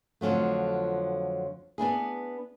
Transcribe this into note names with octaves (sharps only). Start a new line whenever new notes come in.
F2 D3 F3 F#3 A3
B3 D4 E4 G#4